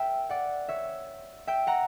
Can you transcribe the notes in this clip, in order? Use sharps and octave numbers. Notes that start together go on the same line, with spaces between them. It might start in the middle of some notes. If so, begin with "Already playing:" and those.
Already playing: A#4 E5 G5
D5 F#5
C#5 E5
E5 G5
F#5 A#5